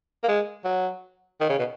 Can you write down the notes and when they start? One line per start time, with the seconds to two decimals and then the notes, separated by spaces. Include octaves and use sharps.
0.24 A#3
0.28 G#3
0.65 F#3
1.40 D#3
1.49 C#3
1.59 B2